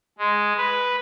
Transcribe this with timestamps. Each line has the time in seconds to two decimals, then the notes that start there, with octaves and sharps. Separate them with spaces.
0.18 G#3
0.57 B4